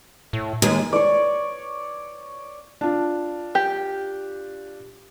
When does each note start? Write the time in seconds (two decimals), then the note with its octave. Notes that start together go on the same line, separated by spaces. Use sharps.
0.33 A2
0.62 D#2 G#3
0.93 C#5 D5
2.81 D4 F4
3.55 G4